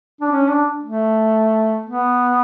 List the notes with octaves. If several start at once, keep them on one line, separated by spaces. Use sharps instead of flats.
D4
C#4
D4
A3
B3